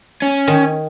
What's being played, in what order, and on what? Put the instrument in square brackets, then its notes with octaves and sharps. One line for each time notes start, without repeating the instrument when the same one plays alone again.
[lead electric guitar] C#4
[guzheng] D#3